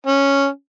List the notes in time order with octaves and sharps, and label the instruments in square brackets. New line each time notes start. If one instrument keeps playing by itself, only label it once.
[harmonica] C#4